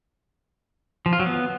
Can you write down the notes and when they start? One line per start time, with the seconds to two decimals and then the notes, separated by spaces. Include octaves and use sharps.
1.06 F3
1.13 F4
1.20 F#3
1.26 B3